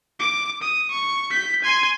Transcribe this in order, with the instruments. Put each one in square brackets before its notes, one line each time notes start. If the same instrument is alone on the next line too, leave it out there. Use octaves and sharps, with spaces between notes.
[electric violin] D6
D#6
C#6
G6 B6
G#5 C6